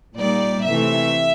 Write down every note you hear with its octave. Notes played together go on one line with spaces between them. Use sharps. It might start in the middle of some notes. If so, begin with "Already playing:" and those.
A#2 G3 A#3 D#4 D5
C3 E3 A3 E5